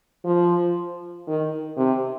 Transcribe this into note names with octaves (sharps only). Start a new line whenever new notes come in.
F3
D#3
C3